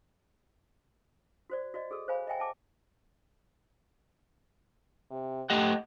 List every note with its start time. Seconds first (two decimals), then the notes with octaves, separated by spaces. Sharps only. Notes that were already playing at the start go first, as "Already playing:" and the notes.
1.50 F#4 C5 D5
1.74 F#4 D5 D#5
1.91 G#4 A4 E6
2.08 C5 C#5 F5 G#5 B5
2.27 D#5 E5 G5 G#5
2.39 E5 A5 D6
5.11 C3
5.50 A3 G4 D#5 F#5